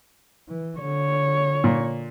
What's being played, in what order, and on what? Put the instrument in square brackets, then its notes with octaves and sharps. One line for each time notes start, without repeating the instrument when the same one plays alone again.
[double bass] E3
[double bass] D3 [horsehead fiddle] C#5
[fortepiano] A#2